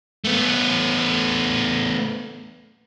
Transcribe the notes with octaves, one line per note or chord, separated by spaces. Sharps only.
A3 B3